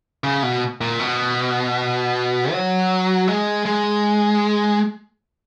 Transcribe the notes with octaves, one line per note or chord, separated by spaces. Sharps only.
C#3
B2
A#2
B2
F#3
G#3
G#3